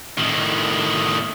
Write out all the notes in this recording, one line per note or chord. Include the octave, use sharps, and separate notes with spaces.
A2 D#3